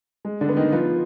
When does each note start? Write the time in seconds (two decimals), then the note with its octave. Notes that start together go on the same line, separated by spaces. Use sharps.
0.25 G#3
0.41 D3 D4
0.49 B3
0.56 D#3 D#4
0.72 F3 B3 F4